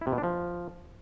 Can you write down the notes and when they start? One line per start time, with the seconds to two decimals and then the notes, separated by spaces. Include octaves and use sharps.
0.01 E4
0.07 C3
0.12 B2
0.18 D4
0.24 F3